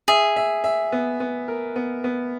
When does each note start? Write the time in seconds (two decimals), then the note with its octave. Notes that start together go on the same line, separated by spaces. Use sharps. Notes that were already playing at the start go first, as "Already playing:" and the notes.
0.08 G#4 E5
0.36 E5
0.64 E5
0.92 B3
1.20 B3
1.48 A#4
1.76 B3
2.04 B3